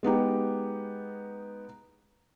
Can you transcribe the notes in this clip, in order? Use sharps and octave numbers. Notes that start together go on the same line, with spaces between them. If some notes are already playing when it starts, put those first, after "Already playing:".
G#3 B3 D#4 G4